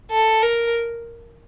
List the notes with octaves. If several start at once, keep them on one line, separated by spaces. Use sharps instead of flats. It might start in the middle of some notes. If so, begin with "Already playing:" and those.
A4
A#4